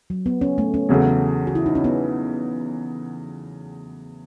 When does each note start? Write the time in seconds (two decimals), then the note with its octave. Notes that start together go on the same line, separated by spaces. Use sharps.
0.10 F#3
0.26 B3
0.41 C#4
0.58 A3
0.74 C#4
0.89 E2 C#3 F#3 A3
1.47 F#4
1.55 E4
1.66 D#4
1.75 C#4
1.84 B3